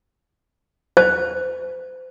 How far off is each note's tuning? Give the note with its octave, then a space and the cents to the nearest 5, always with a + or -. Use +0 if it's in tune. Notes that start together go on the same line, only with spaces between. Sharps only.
C5 -35